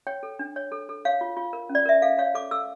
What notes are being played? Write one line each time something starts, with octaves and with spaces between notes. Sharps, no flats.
C#5 G5
A4
D4
C#5
A4
A4
C#5 F5
F4
F4
A#4
C#4
D5
A#4 E5
A4 F5
C#5 F5
A4 D6
A4 E6